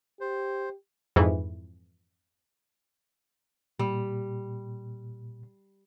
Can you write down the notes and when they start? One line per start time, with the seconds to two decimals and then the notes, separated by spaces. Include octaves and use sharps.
0.21 G4 C5
1.16 F2 G#2 E3
3.79 A#2 G3